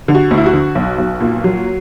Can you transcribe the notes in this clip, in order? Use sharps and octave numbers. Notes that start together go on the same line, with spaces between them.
D3
F#4
D2
E4
F#4
D3
B1
B1
A#2
F#3